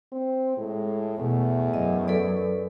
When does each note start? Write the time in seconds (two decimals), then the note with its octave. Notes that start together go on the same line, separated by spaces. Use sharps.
0.13 C4
0.57 A2 G#3
1.19 E2 B2 A3
1.74 F#2 D#5
2.08 A4 B4 D5